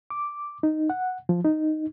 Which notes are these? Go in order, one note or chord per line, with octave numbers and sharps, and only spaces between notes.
D6
D#4
F#5
F3
D#4